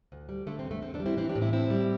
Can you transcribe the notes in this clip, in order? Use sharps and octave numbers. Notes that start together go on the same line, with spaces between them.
D2
G3
D3 A3
C4
E2
A3
E2 C4
A3 D4
G3
C4 E4
E3 C4 E4
D4 G4
A2
C4 E4
A2 C4 E4
G3